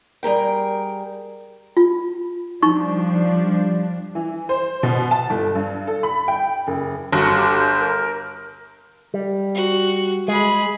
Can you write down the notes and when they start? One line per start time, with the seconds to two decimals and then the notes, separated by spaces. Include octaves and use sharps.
0.23 G3 G#4 A#4 G5
1.77 F4
2.63 F3 G3 D4 D#4 C#6
4.15 E3
4.49 C5
4.83 B2
5.11 A5
5.30 G1
5.55 G2
5.87 A4
6.03 B5
6.28 G5
6.67 F#1
7.12 G1 F#4
7.35 G4
7.59 G6
7.78 A#4
9.14 G3
9.55 F#4
10.28 G#3 G#4 B5